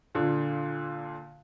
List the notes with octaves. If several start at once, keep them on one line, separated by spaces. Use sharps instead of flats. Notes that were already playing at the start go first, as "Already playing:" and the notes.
A#2 D3